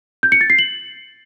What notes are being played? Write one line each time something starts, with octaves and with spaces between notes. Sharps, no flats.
G6
C#7
A6
C7
F#7